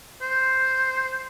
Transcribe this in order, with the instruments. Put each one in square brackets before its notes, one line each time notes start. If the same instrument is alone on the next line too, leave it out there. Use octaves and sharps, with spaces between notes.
[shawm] C5